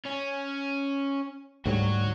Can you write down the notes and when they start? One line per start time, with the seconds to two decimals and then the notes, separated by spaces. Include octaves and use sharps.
0.06 C#4
1.66 D2 G#2 G3 F#4 C#5